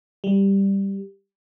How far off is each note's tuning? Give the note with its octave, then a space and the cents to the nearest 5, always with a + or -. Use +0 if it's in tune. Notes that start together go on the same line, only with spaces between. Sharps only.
G3 +5